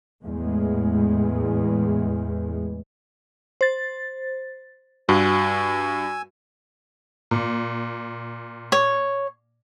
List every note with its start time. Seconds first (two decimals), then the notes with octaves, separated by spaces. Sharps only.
0.23 E2 A2 G#3
3.61 C5 A6
5.09 G2 F#4 G#5 E6
7.31 A#2
8.72 C#5